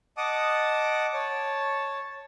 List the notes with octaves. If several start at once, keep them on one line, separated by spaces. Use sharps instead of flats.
D#5 F#5 A5 D6 D#6
C#5 A5